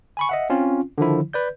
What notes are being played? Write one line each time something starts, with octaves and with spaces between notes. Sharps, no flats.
G#5 B5 C#6
D#5 E5 F#5
C4 C#4 F4
D3 D#3 F3 E4
B4 D5 G6